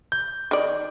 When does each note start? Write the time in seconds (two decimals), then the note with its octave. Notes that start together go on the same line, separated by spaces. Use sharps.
0.12 G6
0.51 D#3 D5